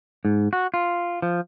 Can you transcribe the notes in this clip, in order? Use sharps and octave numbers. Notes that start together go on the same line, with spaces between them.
G#2
F#4
F4
F3